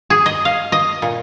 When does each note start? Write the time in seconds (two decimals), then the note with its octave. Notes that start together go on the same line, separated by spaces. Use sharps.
0.10 G#4
0.26 D#5
0.45 F5
0.72 D#5
1.02 A#2